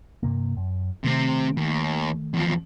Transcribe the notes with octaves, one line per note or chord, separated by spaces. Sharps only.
G2 C3 A#3
F#2
C3 D#3 A3 C4
D#2
E2 F3